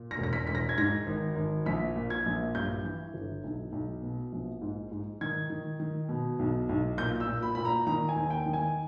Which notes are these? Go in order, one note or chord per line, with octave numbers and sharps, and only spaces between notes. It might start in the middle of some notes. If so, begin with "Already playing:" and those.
Already playing: A#2
A#6
E1
A#6
B6
E1 B6
A#6
G#6
G#2 A#6
G#1
G#1
A#1 B6
A#2
G#6
A#1
G2 G6
E3
G1
B1
B1
B2
A#1
G#2
G#2
D#3 G#6
D#3
D#3
B2
B1
B1
A#2 G6
E6
A#2
B5
A#2 B5
A#5
D#3 A#5
G#5
D#2
G5
D#3
G#5